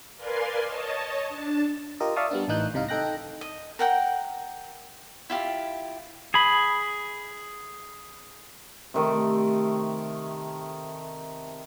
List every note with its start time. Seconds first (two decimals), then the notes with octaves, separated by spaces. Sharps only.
0.17 A#4 B4 D5 F5 G#5 C6
0.64 C#5 D#5 A5
1.29 D4 A5
2.00 F4 G4 A#4 D#5
2.16 D5 E5 F5 A5 C#6 D#6
2.31 G3 B3 D4
2.48 A1 A2 E3 D#4 F#6 G6
2.74 C#2 C3 D#4 F5
2.88 D#4 A4 G5 F#6 A#6
3.41 D#5
3.79 A#4 F#5 G5
5.30 E4 F4 G4
6.34 G#4 B5
8.94 C3 D#3 A3